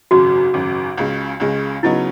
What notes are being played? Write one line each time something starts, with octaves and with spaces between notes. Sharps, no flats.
G#1 F#2 C#3 F#4
G#1 F#2 C#3
C#2 C#3 G#3
C#2 C#3 G#3
C#3 F#3 B3 D#4 E4